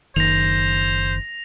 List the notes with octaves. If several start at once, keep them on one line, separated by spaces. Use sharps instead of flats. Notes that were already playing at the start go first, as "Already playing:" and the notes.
F#1 D#3 C5 A#6 F7